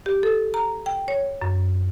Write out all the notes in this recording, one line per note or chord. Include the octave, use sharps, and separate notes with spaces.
G4
A4
A#5
G5
C#5
F#2